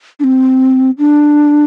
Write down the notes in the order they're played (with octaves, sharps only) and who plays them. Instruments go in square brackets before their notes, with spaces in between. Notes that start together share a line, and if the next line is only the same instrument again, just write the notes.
[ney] D4
C4
D4